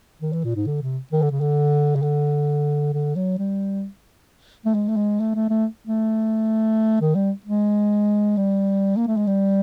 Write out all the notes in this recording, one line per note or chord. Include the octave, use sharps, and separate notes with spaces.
D#3
E3
A#2
G#2
D3
C3
D#3
D3
C#3
D3
C#3
D3
D3
F#3
G3
A3
G#3
A3
G#3
A3
A3
A3
A3
D#3
G3
G#3
G3
A#3
A3
G#3
G3